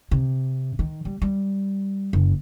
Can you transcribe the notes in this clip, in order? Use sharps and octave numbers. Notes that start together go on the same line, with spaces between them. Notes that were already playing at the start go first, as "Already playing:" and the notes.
C3
D#3
G3
G3
F#1